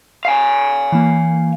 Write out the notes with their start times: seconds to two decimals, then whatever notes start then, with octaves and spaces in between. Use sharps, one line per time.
0.25 F5 G#5
0.92 E3 A#3